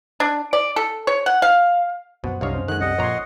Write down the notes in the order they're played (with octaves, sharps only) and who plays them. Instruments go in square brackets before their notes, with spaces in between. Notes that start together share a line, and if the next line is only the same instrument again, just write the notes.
[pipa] D4
D5
A4
C#5
F#5
F5
[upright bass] F#2 [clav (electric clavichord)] B2 [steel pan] C5 F#5
[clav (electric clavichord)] C2 C3 C#5 [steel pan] D4 D#5 F5
[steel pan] C#4 C5
[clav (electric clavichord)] D#3 G#3 [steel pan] A4 F#5 [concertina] F#6
[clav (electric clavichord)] C2 G3 [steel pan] C#4 [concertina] D#5 F#5
[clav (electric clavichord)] A#1 A#2 A#5 [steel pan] C#5 C6